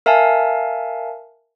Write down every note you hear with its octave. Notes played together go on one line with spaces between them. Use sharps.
A#4 E5 F5 G#5 A5